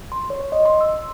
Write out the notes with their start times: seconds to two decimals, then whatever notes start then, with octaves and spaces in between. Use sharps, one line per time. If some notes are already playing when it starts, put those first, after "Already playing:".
0.12 C6
0.30 C#5
0.52 D#5
0.65 C6
0.81 E6